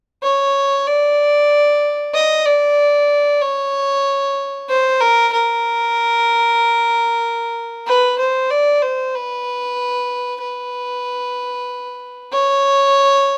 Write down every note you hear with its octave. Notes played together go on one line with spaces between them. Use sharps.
C#5
D5
D#5
D5
C#5
C5
A#4
A#4
B4
C5
D5
C5
B4
B4
C#5